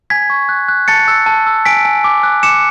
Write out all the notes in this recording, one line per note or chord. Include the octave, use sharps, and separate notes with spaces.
G#5 G#6 B6
C#6
F#6
F#6
A5 A6 C#7
E6
A5
E6
G#5 B6 D7
G#5
D6
F#6
D6 C#7 E7